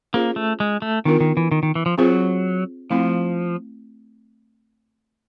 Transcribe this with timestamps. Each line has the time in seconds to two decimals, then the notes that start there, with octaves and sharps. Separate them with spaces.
0.13 A#3 C#4 F4 G#4 C5
0.36 A3
0.60 G#3
0.82 A3
1.05 D#3 B3 D4 F4 A#4
1.20 D#3
1.37 E3
1.52 D#3
1.63 D#3
1.75 E3
1.86 F3
1.98 F#3 C4 F4 G#4 C5
2.90 F3 A3 C4 E4